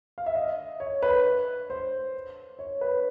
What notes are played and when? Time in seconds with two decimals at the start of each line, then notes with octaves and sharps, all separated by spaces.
0.18 F5
0.26 E5
0.35 D#5
0.80 C#5
1.02 B4
1.70 C5
2.59 C#5
2.81 B4